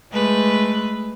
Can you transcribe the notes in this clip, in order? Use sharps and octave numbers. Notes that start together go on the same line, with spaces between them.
G#3 A3 B4